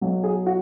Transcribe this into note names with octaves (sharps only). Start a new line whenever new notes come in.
B1 B2 F#3
G#4
F#4